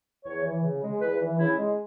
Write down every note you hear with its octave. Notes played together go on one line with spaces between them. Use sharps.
E2 C#5
E3
C#3
G#3
E2 B4
E3
C#3 E4
G#3